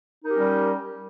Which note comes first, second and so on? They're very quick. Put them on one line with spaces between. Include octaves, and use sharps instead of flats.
D#4 A#4 G4 C#4 G3